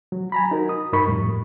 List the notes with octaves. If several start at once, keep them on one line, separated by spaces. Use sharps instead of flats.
F#3
G#5 A#5 B5
D#4 F#4 A#4
D#6
G2 D#4 A#4 B5 C#6
F2 A2 G3